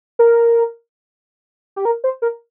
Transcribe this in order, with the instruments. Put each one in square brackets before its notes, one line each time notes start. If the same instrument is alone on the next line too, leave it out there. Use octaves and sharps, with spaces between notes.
[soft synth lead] A#4
G4
A#4
C5
A#4